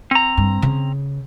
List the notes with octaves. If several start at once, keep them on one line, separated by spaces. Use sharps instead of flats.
C4 A#5
G2
C#3